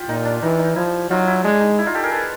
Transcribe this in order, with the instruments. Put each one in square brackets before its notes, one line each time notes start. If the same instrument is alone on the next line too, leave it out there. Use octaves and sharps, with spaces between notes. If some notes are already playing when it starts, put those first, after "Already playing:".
Already playing: [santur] F4 G4
[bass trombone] A#2 [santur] D#4
[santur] D4
[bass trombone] E3 [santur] D#4
[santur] D#4
[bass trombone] F3 [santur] E4
[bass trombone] F#3 [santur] D#4 F4
[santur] E4
[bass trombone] G#3 [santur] D4
[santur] D#4
E4
D#4 F4
G4 A4
G#4 A#4
A4 B4